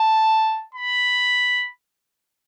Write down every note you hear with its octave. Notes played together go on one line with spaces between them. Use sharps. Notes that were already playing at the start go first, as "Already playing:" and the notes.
Already playing: A5
B5